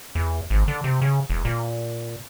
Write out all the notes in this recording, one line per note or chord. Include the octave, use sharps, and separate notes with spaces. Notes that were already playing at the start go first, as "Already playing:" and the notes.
E2
G#1
D3
C3
C#3
E1
A#2